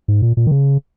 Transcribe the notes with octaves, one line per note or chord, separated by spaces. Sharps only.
G#2
A#2
A#2
D#3
C#3